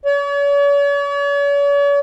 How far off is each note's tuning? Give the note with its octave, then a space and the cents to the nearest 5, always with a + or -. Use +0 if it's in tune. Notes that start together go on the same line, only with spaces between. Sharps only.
C#5 +45